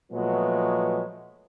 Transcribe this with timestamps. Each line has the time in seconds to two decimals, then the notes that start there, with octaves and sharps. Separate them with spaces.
0.12 A#2 F3 F#3 G#3 A3 B3